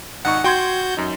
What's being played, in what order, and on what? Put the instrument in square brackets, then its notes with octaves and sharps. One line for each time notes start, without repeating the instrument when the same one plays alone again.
[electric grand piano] G#1 D#4 C#6 [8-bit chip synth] F#5
[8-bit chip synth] F#4 G6 [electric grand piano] G5 C6 G#6
[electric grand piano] F#2 D#4